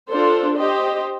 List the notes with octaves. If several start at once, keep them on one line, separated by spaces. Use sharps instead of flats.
D4 F4 A4 C5
G4 C5 D#5